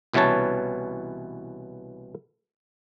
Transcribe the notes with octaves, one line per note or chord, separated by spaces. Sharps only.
C2 B2 E3 C#4 C#5 A5